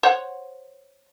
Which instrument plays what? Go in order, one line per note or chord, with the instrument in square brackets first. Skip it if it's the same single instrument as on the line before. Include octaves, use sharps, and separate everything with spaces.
[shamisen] C5 C#5 F#5